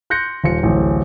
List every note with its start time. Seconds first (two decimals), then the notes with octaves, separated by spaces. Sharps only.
0.10 C6 F#6 G6 A#6 C#7
0.44 D#1 F4 C6 C#7
0.63 D1 A1